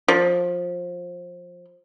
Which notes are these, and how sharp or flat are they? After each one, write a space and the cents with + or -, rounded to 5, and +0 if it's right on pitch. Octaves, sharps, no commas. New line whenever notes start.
F3 +20